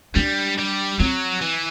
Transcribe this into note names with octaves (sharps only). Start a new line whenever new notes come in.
G3 D4
G3
F#3 C4
E3